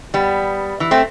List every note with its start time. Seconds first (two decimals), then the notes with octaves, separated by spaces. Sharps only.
0.14 G3 B3
0.80 E3
0.91 A3 C4